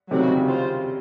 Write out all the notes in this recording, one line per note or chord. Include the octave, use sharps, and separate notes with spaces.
C3 D#3 F#3 A3 C4 F#4
C#3
C3
C#3
C4 F4 C5